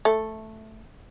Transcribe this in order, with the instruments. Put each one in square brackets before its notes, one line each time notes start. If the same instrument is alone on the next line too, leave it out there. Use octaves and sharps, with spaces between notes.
[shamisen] A3